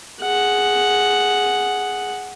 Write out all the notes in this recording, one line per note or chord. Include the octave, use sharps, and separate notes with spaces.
G#4 F#5